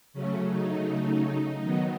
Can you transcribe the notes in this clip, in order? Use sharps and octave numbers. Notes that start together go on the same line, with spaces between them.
C#3 F#3 A3 C#4
D#4
D#3 F#3 B3